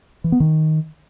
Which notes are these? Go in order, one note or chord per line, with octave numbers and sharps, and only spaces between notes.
E3
B3
D#3